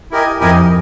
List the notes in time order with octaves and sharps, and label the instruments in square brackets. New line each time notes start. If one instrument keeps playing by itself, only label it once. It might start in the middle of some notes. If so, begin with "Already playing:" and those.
[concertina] E4 G4 A#4 D#5 G#5
[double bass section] F2 [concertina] E4 G4 A#4 D#5 G#5